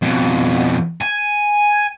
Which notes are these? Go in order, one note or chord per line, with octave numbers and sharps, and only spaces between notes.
F2 B2
G#5